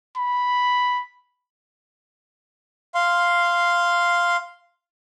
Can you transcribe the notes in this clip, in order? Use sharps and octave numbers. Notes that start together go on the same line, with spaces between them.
B5
F5 C6